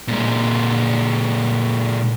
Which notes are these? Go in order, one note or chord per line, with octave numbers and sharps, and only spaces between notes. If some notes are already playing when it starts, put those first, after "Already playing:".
A#2 G#3